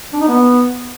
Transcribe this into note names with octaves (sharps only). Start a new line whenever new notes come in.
D4
D#4
B3